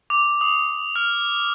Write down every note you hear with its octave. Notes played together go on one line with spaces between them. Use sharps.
D6
D#6
F6